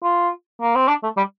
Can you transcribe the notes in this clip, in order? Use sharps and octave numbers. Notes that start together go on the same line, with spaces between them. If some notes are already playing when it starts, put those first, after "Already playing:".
F4
A#3
C4
D4
A3
G3